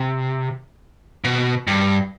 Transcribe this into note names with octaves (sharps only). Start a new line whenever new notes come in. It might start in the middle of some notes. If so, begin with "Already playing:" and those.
Already playing: C3
B2
G2